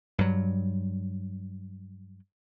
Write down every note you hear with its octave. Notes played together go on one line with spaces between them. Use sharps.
G2 F#3